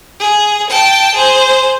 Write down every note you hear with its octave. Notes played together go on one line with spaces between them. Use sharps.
G#4
G5 A5
G#4 C5